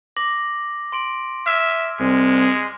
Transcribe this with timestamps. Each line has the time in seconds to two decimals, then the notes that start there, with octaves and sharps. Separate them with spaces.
0.17 D6 A#6 F#7
0.92 C6 D7 F#7
1.46 E5 F6 G#6
1.99 C2 G#3